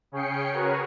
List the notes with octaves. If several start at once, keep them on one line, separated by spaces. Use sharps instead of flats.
C#3 C#4 G#4 G5 C7 C#7
F#4 G#4 A#4 B4 C#5